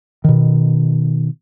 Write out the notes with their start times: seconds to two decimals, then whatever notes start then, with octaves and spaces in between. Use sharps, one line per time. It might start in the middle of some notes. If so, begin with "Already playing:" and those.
0.24 B2 D#3